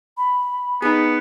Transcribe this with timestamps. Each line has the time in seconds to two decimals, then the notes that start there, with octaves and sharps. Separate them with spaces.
0.17 B5
0.82 B3 D#4 G#4